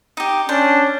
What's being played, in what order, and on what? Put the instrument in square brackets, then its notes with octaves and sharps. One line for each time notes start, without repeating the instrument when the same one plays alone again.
[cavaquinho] D#4 G4
[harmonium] C#4 [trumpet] D4 [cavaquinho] C5